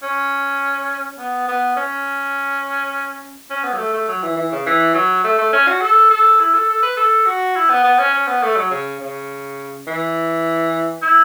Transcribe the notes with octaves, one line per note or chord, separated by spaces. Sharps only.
C#4
B3
B3
C#4
C#4
B3
F#3
A3
A3
F#3
E3
E3
C#3
E3
F#3
A3
A3
C#4
F#4
A4
A4
E4
A4
A4
B4
A4
F#4
E4
B3
B3
C#4
C#4
B3
A3
F#3
C#3
C#3
E3
E4